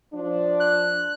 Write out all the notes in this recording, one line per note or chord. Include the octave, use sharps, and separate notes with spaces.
F3 D4
F#6